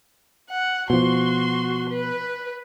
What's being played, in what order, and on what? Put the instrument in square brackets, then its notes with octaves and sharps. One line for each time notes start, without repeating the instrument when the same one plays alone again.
[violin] F#5
[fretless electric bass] B2 F3 [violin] F#4 C6
[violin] B4